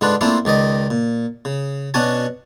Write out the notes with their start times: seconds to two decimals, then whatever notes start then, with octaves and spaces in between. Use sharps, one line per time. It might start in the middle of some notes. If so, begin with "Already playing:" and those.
0.01 G#2 D3 D4 F4 B4
0.21 A3 A#3 C4 D4 E4 F4
0.45 C#2 D#3 D5 D#5
0.90 A#2
1.45 C#3
1.94 B2 C#4 D4 F#4 G#5 A5